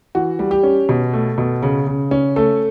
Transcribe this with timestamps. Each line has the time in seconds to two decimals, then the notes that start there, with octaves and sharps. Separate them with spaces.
0.15 E3 F#4
0.39 G3
0.51 G4
0.63 C#4
0.89 B2
1.13 A3
1.38 B2
1.63 C#3
1.87 C#3
2.11 C#4
2.36 A3 A4